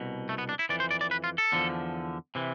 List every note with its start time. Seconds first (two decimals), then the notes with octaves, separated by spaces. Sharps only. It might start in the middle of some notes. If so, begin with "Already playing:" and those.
Already playing: C2 B2
0.29 A3
0.38 B3
0.49 D4
0.59 E4
0.69 F2 E3 D5
0.80 C5
0.91 D5
1.01 D5
1.11 B4
1.24 F4
1.38 A4
1.52 E2 D3 F3
2.35 C3 E3